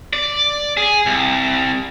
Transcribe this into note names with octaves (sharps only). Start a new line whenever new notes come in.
D5
G#4
C2